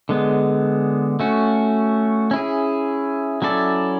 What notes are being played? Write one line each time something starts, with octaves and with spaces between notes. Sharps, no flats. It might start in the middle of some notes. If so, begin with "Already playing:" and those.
D3 G#3 B3
A3 C#4 F#4
C#4 E4 G#4
F#3 C#4 E4 A4 D5